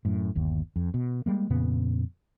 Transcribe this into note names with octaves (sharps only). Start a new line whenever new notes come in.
F#2 A2
G1 D#2
F2
B2
G3 G#3 A#3
F2 A#2 C#3 B3